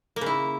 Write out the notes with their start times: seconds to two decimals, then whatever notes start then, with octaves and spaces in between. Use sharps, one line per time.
0.16 A#3
0.21 C#3
0.26 E4